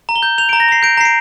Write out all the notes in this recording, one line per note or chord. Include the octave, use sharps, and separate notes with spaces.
A#5
G7
G6
G6 F7
D7
A#5
A#6
A#5 C7
G6 D7
A#5 C7
D7